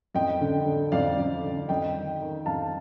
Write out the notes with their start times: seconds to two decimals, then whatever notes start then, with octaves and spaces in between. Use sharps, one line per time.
0.14 F2 D#5 G5
0.41 D3
0.66 D3
0.92 F2 D5 F5
1.18 F2
1.43 D3
1.69 F2 D#5 G5
1.95 D#3
2.21 D#3
2.46 F2 F5 A5